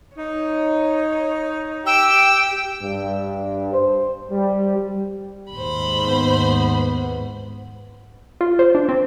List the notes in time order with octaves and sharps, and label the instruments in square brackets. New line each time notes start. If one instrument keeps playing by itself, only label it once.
[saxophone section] D#4 [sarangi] C#5
[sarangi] G4 [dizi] G5 [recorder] E6
[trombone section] G2
C5
G3
[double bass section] D#2 G#2 [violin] C5 B5
[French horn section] B3
[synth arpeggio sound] F4
C5
D4
C4